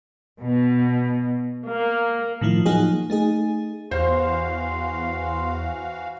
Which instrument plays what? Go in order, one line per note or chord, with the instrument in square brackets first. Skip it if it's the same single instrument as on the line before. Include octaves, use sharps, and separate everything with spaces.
[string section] B2
A#3
[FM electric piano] A2 D#3 F3 E4
F3 F#3 A#3 D#4 F#4 G#4
A3 D#4 G#4
[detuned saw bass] E2 [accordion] E3 F#4 F5 [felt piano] C5 [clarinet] C6